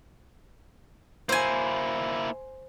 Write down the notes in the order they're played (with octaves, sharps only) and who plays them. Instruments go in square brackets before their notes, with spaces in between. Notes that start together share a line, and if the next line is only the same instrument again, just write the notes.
[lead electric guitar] A#3 E4 [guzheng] C5 G#5